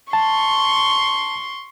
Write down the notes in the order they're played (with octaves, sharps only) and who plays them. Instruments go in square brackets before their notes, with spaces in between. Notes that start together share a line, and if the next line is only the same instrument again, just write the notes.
[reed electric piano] A5 [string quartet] C6 C#6